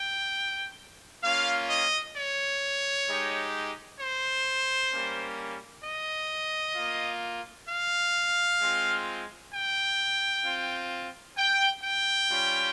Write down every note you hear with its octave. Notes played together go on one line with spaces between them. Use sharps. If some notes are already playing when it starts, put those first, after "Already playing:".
Already playing: G5
A#3 C#4 F4 F5
D#5
C#5
G#3 D#4 G4
C5
G3 A#3 C#4
D#5
A#3 F4
F5
G#3 C4 F4
G5
C4 F4
G5
G5
G3 C#4 F4